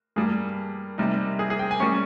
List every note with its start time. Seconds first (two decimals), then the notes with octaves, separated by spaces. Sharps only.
0.16 G2 G3 A#3 G#4
0.98 C3 G3 A#3 D#4
1.39 G#4
1.50 G#4
1.59 G5
1.71 G#5
1.80 G3 A#3 C#4 C#6